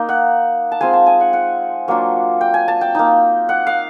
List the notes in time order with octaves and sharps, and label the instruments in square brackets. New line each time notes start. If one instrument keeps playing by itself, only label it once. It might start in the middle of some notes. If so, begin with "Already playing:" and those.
Already playing: [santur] A#3 D#4
F#5
A5
G#3 C4 F4 G#5
A5
G#5
F#5
F#5
F#3 A#3 D4 F4
G5
G#5
A5
G5
A#3 D#4
F#5
F5